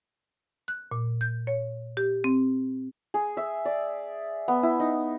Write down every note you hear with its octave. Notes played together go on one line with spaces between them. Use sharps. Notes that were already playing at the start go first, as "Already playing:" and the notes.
F#6
A#2
G6
C#5
G4
C4
G#4
E5
D5
B3
E4
D#4